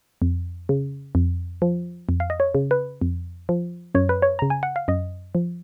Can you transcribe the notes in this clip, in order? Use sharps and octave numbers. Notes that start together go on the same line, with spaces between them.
F2
C#3
F2
F3
F2
F5
D#5
C#5
C#3
B4
F2
F3
F#2 C#5
B4
C#5
C#3 A#5
G#5
F#5
F5
F#2 D#5
F3